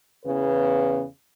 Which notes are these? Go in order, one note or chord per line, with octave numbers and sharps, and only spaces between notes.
E2 C#3 B4